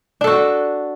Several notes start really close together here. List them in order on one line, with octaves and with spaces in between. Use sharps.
D4 A4 F#4